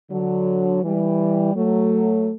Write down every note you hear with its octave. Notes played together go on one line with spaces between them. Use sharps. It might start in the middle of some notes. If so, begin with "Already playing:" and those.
D3 F#3
E3 G3
F#3 A3